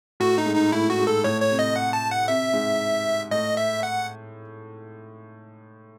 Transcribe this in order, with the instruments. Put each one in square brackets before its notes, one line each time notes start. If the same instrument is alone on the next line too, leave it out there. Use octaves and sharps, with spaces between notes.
[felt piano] A2 [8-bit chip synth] F#4
[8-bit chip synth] D#4
[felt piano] G#2
[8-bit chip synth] D#4
[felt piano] A2 [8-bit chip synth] E4
[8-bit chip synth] F#4
[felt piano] G#2
[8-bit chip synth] A4
[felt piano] A2 [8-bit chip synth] C#5
[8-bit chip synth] C#5
[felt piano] C3
[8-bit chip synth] D#5
F#5
A5
F#5
[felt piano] C3 [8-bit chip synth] E5
[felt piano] G#2
[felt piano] A2 [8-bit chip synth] D#5
[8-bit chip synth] E5
F#5